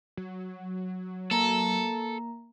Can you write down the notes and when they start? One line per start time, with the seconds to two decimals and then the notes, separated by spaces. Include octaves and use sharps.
0.17 F#3
1.31 A#3 A4 A#5